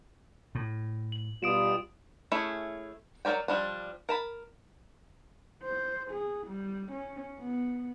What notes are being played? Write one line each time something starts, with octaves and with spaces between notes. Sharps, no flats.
A2
F#7
B2 G3 F4 D#6 D7 E7
A3 C#4 E4 G#4
F#3 D4 A#4 D5 G5
F3 G3 D4
A#4 A5 B5
C5
G#4
G3
C#4
B3